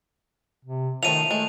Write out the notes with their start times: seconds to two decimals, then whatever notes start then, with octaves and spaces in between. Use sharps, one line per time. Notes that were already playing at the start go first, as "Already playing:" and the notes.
0.65 C3
1.03 D#3 F3 F#3 A3 D#7 F7
1.31 G#3 A3